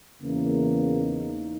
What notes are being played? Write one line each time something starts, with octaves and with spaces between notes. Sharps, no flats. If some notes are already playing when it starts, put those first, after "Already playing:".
E2 C#3 E3 A#3
D#4